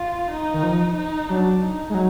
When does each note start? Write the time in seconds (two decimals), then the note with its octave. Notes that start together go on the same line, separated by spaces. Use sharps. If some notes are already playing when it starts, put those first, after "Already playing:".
Already playing: F4
0.31 D#4
0.53 D#3
0.63 F3
0.97 D#4
1.29 F#3 D4
1.62 D#4
1.90 G#3
1.94 F#3